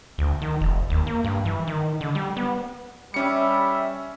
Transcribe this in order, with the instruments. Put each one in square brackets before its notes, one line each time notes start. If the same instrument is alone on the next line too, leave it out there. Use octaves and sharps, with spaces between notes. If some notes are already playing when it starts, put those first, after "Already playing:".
[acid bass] D2
D#3
F1
D#2
A#3
G2
E3
D#3
D3
G3
B3
[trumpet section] G3 E5 [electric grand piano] C#4 C#7